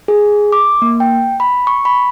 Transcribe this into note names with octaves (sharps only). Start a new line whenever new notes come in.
G#4
D6
A#3
G5
B5
C#6
B5